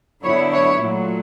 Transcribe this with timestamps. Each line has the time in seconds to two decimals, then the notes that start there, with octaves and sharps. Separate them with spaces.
0.24 D3 F#3 B3 E4 C#5
0.53 C#5
0.82 A#2 F#3 A3